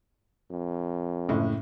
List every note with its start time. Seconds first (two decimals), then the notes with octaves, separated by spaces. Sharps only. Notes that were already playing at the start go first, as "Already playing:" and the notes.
0.50 F2
1.29 F#1 A2